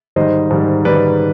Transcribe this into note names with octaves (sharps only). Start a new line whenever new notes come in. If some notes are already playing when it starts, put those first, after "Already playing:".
G#2 D#3 G3 C5 D#5
G#2 D#3 G3
D#3 G3 B4 D5